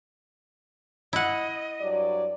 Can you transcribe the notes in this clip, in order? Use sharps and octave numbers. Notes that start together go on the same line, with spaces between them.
E4 D#5 F#5
G2 F#3 D5